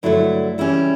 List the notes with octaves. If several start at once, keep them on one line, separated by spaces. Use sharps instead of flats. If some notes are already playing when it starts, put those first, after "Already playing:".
G2 D3 F#3 A3 E4
C#3 E3 G3 C#4 E4